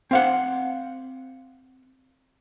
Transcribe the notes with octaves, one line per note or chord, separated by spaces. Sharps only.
C4 F5 F#5